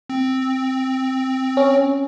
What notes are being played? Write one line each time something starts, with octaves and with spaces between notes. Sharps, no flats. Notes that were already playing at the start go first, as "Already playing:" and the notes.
C4
C#4